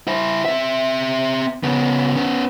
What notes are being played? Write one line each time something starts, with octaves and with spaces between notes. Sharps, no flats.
E4 C5
C4 E5
C#3 B3
B3 C#4